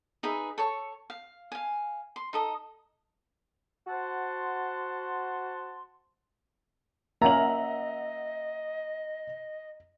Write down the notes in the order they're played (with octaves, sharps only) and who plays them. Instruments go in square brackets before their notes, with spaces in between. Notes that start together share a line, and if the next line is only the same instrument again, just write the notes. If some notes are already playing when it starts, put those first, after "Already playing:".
[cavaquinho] D#4 G#4 B4 E5
A4 C#5 C#6
F5
F5 G#5
C6
D#4 A4 D#5
[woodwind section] F#4 C5 F#5 A5 C6
[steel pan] A#3 C#4 [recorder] D#5 [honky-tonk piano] E5 F#5 F#7 [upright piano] A#5